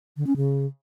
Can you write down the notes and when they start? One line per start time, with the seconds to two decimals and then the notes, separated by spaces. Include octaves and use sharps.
0.17 D3
0.27 C#4
0.36 C#3